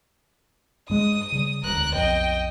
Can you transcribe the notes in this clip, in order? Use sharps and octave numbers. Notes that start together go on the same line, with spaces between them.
G2 G#3 D#6
C#3 G3
E1 D2 A#4 F#6
B1 F2 D#5 G5